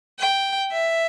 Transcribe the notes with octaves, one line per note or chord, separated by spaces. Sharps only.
G5
E5